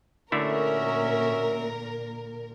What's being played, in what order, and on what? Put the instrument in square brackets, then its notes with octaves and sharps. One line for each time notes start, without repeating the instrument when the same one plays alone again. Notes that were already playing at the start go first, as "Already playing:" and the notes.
[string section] A#2 A#4 [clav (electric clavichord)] D3 A3 E4 [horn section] C#4 F#4 E5